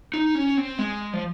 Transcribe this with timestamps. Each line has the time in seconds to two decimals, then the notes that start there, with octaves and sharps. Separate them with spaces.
0.14 D#4
0.35 C#4
0.57 C4
0.79 G#3
1.13 F3